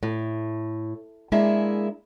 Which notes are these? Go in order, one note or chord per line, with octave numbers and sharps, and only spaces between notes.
A2
G#3 A#3 D4 E4 G#4 E5